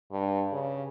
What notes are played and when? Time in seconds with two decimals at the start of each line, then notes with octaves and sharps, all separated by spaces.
0.11 G2
0.52 C#3